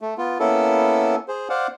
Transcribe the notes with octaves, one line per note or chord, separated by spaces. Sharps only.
A3
B3 F4
A#3 B3 C#4 E4 A4
G#4 C5
C5 D5 F5 F#5